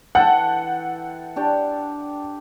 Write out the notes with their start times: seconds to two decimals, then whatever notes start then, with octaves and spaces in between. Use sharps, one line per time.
0.15 E3 A4 F#5 G5
1.36 D4 G4